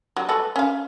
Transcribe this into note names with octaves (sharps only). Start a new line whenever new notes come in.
F#3 G3
F#4 A4 B4
C#4 F5